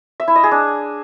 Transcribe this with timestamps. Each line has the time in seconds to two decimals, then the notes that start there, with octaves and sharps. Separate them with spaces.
0.20 E5
0.28 E4
0.36 D#5
0.44 G#4
0.51 D4